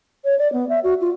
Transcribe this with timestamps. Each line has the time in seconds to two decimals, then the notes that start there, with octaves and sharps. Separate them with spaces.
0.25 C#5
0.39 D5
0.53 B3
0.69 E5
0.84 F#4
1.01 F4